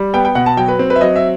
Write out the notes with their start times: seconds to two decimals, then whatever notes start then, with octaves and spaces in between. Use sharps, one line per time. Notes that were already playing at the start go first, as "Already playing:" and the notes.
Already playing: G3
0.13 B3 G5
0.25 G5
0.35 B2 F#5
0.46 A5
0.57 F#3 G5
0.68 B4
0.79 C4
0.90 B4
0.96 E5
1.01 F#3 D#5
1.16 E5